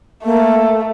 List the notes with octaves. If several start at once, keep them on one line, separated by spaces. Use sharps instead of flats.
A3 A#3